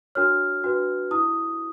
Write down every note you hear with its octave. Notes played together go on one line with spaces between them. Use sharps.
D4 F#4 A#4 C#5 F6
D4 F#4 B4
E4 D#6